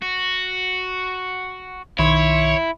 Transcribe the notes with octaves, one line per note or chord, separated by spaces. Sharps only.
F#4
B1 D#3 E4 C#5 C6